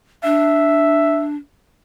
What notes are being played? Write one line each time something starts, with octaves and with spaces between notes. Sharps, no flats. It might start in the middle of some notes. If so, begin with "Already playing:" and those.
D4 E5